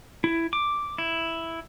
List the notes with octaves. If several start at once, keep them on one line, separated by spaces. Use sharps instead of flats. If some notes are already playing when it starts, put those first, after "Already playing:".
E4
D6
E4